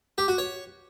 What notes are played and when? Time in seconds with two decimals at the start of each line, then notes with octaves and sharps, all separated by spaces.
0.18 G4
0.28 F#4
0.38 C#5